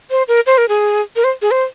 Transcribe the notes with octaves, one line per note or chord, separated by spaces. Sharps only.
C5
A#4
C5
A#4
G#4
A#4
C5
G#4
C5